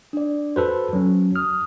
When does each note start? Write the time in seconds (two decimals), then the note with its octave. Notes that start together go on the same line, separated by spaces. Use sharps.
0.13 D4 D5
0.56 F#4 A4 B4 C5
0.93 F#3 C#4
1.36 D#6 F6